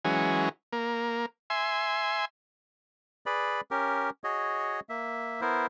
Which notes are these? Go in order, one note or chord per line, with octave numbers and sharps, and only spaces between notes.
E3 F#3 G#3 C#4
A#3
E5 G#5 C6
G#4 B4 D5 B5
C#4 G4 A#4
F#4 G#4 C#5 D#5
A#3 E5
B3 E4 A#4 C5